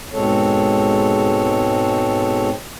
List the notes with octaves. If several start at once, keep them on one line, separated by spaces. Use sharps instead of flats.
G#2 B2 G#3 C4 A4 C#5